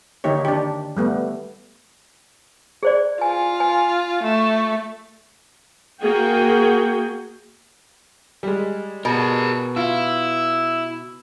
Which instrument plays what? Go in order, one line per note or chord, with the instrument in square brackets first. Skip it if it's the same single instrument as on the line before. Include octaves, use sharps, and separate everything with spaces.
[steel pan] D3 D#3 A#3 D#4 G4 C#5
D4 G4
G3 A3 B3
[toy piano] G#4 C5 D5
[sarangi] F4 [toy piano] G#5
[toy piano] G#5
[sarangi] A3
[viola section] A#3 F#4 G#4 G5
[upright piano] G3 G#3
[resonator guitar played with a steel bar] B2 [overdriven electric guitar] G#4 A#4
[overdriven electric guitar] E4 [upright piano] F4 [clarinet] E6